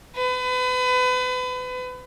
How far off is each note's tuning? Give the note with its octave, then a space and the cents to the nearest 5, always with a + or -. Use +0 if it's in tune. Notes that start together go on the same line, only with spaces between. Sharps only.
B4 +35